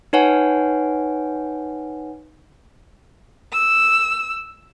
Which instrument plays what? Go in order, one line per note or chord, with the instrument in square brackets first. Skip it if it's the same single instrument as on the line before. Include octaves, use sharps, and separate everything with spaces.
[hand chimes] D#4 B4 C#5 F#5 G#5
[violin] E6